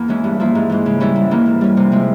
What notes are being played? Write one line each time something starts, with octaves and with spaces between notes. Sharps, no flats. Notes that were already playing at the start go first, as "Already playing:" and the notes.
Already playing: E2 A#3
E3 G#3 C#4 E4
G2
F3 A#3 E4
G#2
E3 G#3
C#3
E3 G3 C#4 E4
G#2
E3 A#3 C#4
G#2
G3 C#4
C3
F3 G#3 E4